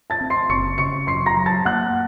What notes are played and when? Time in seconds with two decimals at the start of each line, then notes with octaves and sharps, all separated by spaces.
0.10 A5 A6
0.21 C4
0.30 C6 C7
0.49 F#1 C#6 C#7
0.78 C#3 C#6 C#7
1.07 F#2 C6 C7
1.26 A#5 A#6
1.37 F#3
1.46 A5 A6
1.65 A#3 F#5 F#6